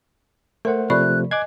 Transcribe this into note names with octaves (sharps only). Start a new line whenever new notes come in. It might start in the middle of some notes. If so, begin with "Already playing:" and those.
A3 A#4 C5 F#5
C3 F3 A3 D5 B5 C#6 F#6
D#5 G#5 D6 F#6 G#6